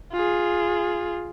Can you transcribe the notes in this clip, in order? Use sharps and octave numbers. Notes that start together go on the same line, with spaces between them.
F4 G#4